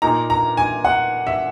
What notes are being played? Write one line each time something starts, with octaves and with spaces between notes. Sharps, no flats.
A#2 A#3 D#4 A#5
A#5
G#5
F#5
E5